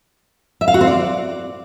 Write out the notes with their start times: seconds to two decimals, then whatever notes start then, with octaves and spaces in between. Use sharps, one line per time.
0.61 E5
0.68 F5
0.74 F#4
0.81 C4
0.87 D5